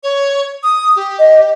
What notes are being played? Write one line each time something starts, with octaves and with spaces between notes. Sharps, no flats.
C#5
D#6
G4
D#5